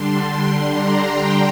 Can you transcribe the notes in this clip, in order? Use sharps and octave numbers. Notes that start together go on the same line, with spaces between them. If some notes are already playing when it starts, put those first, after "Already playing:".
Already playing: D3 G3 D4 C6
C6
A#5
G5